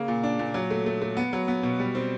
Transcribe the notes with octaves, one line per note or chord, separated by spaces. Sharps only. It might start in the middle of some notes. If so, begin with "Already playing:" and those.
Already playing: C#3 A#3
A#2
D4
A#2
F#3
A3
A3
A3
B3
F#3
B3
B2
G3
C4